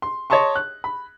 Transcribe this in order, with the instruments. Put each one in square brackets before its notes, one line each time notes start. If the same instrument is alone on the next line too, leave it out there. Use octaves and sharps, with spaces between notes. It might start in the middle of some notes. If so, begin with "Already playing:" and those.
[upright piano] C6
C#5 D#5 A5 C6 C#6
F#6
B5